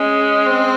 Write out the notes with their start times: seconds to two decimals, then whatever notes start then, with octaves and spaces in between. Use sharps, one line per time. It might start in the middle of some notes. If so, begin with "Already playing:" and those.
Already playing: G#3 C#4
0.46 C4